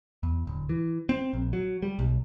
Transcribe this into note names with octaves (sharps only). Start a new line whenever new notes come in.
E2
D1
E3
C4
A#1
F#3
G3
B1